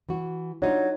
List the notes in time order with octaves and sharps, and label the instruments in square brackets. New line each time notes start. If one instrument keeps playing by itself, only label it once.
[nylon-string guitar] E3 F#4
[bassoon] F#3 [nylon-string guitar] D4 D#4 F4